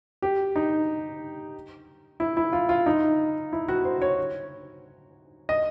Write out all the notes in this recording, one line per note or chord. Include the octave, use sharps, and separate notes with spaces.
G4
D#4
E4
E4
F4
F4
D#4
E4
F#4
C5
C#5
D#5